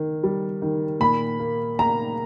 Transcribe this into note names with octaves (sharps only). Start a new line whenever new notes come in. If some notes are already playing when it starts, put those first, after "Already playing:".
Already playing: D#3
G3
D#3
A#2 B5
A#3
A#3 A#5